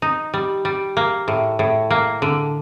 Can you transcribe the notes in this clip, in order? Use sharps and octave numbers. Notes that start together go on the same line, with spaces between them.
D#4
G3
G3
A#3
A2
A2
A#3
D3